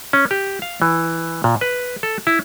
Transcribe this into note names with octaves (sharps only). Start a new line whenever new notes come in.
C#4
G4
F5
E3
A#2
B4
A4
E4